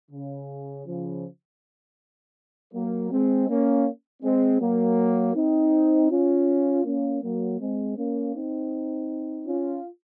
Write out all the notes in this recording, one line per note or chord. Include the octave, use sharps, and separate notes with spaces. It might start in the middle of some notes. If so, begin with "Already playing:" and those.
C#3
C#3 F3
F#3 A#3
G#3 C4
A#3 C#4
G#3 C4
F#3 A#3
C4 D#4
C#4 F4
A#3 C#4
F#3 A#3
G#3 C4
A#3 C#4
C4 D#4
C#4 F4